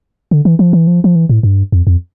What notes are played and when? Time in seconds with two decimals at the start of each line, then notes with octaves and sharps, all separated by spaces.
0.31 D3
0.45 E3
0.59 F3
0.73 E3
0.87 F3
1.04 F3
1.16 E3
1.29 A2
1.43 G2
1.72 F2
1.87 F2